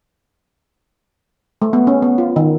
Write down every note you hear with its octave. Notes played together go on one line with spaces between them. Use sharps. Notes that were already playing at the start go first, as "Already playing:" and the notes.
A3
B3
C#4
B3
F4
D#3